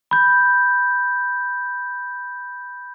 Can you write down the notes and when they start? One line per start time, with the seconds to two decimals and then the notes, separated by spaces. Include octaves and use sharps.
0.11 B5 G6